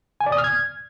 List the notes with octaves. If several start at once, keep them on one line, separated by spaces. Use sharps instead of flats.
G#5
D5
D#6
F6
G#6